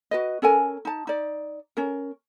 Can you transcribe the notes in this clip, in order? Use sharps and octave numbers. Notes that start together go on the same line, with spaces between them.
F#4 B4 D#5
C#4 A4 A#4 G#5
D#4 A5
D#4 D5
C#4 A#4